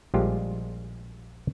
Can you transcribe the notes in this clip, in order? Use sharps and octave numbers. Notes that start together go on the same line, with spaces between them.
A#1 G3 G#3 F4 G4